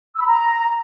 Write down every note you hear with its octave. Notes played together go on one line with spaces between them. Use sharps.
E6
B5
A#5